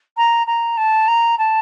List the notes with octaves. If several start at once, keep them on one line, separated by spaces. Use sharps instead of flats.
A#5
A#5
A5
A#5
A5